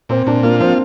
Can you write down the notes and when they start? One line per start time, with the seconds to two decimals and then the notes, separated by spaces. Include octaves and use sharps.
0.09 A#2 C4
0.27 A#2 D4
0.43 A#3 F4
0.60 F3 C4